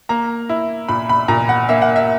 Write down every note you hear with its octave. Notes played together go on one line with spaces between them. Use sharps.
A#3 A#5
E4
A#2 B5
B5
A#2 A#5
F#5
A#3 E5
F#5
E5